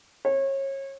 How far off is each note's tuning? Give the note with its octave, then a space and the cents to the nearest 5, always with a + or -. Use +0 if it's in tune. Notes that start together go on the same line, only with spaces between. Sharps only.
C#5 -30